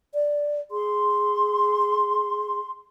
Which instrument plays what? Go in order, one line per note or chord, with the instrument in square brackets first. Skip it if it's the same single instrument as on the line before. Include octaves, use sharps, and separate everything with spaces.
[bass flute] D5
[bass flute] G#4 [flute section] C6